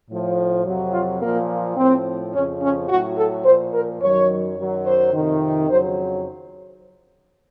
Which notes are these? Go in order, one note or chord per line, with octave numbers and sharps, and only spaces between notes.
A2 F3
F2 C3 F#3
F4
A#2 F3 A#3
A2 F3 C4
F2 C#3 F3 C#4
C#4
A2 F#3 F#4
A4
A#2 F3 C5
A#4
F#2 D#3 F#3 C#5
F#2 D#3 F#3
C5
F2 C3 D#3
F2 C#3 F#3 C5